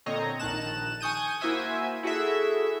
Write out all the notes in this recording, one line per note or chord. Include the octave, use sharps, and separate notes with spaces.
A#2 D3 C4 C#5 D#5 A#5
A#1 D#3 A5 F#6 E7
G#5 C#6 D#6 G6 D#7
A#3 E4 F#4 C5 E5 G#5
E4 F#4 G#4 A4 E5